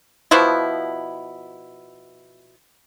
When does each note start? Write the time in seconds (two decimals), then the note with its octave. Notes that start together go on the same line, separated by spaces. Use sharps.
0.31 B2 F3 B3 E4